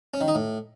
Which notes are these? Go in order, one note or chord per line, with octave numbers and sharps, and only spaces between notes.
C#4
D#3
D#4
A2